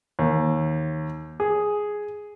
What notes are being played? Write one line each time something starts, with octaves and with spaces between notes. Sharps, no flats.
D#2
G#4